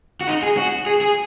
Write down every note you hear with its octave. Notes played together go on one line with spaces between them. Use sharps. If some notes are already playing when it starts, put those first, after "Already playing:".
F#4
D#4
G#4
F#4
G#4
G#4